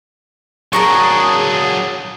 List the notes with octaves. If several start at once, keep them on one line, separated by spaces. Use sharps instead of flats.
F#3 D4 G#4 A#4 A#5 C#6